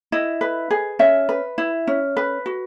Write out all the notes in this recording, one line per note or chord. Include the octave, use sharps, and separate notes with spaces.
E4 D#5
B4
G#4
C#4 E5
B4
E4
C#4
B4
F#4